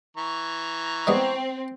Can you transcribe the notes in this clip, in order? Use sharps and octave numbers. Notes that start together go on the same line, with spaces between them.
E3 A#5 C#6
G3 G#3 B3 C4